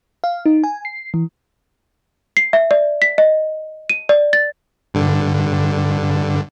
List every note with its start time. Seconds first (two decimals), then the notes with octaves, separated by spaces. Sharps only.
0.24 F5
0.46 D#4
0.64 G#5
0.85 C7
1.14 E3
2.37 C7
2.53 E5
2.71 D5
3.02 B6
3.18 D#5
3.90 D#7
4.09 D5
4.33 A6
4.94 G2 D3